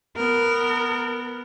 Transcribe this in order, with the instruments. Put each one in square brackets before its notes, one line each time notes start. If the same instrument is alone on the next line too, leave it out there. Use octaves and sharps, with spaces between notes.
[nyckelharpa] B3 [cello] A#4